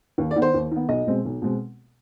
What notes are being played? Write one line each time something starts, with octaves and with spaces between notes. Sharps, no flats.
D#2
D5
D#3 B3
C5
D#2
D#3 B3
B1 D#5
B2 G#3 C4
B1
B2 G#3 C4